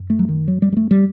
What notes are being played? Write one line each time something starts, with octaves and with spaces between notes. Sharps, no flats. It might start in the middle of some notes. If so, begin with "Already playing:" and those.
Already playing: F#2
A3
F#3
D#3
F#3
G3
G3
A3
G3